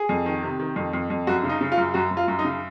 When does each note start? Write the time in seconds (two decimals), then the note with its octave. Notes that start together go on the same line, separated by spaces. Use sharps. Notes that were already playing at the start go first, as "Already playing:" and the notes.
Already playing: G#4
0.09 F2
0.26 D#3
0.43 C3
0.60 D#3
0.76 F2
0.93 F2
1.10 F2
1.27 F#2 F#4
1.44 C#3
1.49 D#4
1.61 C#3
1.72 F4
1.77 F#2
1.94 F#2 F#4
2.11 F#2
2.17 F4
2.28 F#2
2.39 D#4
2.45 C#3